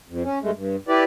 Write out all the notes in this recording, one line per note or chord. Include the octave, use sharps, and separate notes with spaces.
F2
C#4
G2 G#3 A3
G2
E4 G4 B4 D5